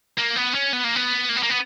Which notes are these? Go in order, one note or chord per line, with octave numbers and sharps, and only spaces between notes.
A#3
B3
C#4
B3
A#3
B3
A#3
B3
A#3
B3